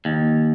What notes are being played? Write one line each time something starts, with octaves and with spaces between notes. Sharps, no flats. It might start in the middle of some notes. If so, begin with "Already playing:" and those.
D#2